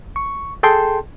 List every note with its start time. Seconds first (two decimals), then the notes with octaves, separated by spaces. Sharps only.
0.16 C#6
0.63 G#4 A4 G5 A5 C6